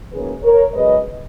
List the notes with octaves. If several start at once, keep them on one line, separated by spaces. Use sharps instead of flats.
F#2 D#3 A#3 C#4 G#4 B4
A#4 C#5
F#2 C#3 G#3 B4 D#5